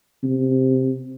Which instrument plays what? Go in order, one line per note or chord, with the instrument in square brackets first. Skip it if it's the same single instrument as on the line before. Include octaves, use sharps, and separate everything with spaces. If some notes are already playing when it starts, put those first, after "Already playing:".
[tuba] C3